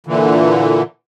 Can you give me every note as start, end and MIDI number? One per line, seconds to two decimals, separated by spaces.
0.07 0.82 46
0.07 0.82 50
0.07 0.82 52